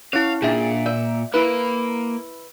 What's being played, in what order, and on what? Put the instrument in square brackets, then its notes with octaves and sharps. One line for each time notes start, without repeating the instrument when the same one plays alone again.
[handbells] C#4 E4 [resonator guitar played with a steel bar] C#5 [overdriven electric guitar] F5
[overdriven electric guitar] A#2 [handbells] D4 E5 [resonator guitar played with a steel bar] G#4
[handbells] D5 [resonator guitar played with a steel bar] E5
[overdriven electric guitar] A#3 [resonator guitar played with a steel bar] E4 B4 [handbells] B5